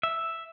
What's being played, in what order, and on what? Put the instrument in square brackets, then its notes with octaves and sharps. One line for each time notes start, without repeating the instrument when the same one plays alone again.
[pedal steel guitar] E5